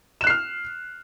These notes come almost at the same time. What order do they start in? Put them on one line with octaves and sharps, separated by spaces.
E7 F#6 C7 F6